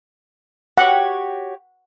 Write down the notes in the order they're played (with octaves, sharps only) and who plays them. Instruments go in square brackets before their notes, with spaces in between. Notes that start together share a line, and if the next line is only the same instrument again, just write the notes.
[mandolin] F#4 G4 C#5 [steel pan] F#5